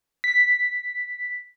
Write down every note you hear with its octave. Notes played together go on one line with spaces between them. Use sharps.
B6